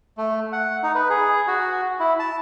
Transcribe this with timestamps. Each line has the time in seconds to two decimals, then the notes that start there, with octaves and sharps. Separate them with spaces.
0.18 A3
0.52 F#5
0.83 D#4
0.95 B4
1.10 G#4
1.47 F#4
2.00 E4
2.19 A5